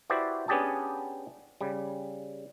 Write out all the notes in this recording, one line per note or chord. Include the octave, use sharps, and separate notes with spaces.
E4 F#4 G4 B4 C5 D5
B3 C#4 D4 G4 G#4 A5
C#3 G3